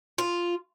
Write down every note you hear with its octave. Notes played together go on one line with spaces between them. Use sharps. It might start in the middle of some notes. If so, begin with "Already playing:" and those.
F4